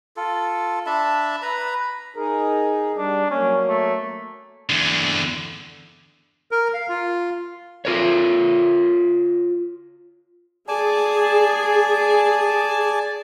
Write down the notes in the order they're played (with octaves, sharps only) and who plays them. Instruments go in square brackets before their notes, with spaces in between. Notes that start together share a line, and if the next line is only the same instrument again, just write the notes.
[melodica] F4 A4
D4 E5 A5 B5
B4 A#5 B5
[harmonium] D#4 G#4 [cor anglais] A#4
[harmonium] G3 [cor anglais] D4
[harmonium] F#3 A#3 [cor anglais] C#4
[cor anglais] A3
[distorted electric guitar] E2 D3
[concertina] A#4
F5
F4
[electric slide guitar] F4 A#4 C#5
[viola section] G#4 [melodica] D5 G#5 A5